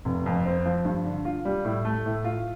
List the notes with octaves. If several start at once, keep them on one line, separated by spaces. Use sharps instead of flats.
F1
F2
C4
F3
G2
D3
F4
G3
A2
A3
A2
F4